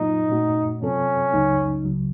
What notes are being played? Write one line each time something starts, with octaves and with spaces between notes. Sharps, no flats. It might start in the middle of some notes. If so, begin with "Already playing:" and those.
Already playing: A#2 F#3 A#3 D#4 F4
A#2 A3 C#4 F#4
C3 F#3 C4 C#4 F4 A4
C#2 C#3 F#3 A#3 D#4
C#2 C#3 F#3